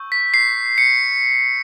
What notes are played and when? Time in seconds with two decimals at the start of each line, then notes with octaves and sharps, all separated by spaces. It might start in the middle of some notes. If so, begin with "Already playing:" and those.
Already playing: C#6 E6 G6
0.12 B6
0.34 C7
0.78 C#7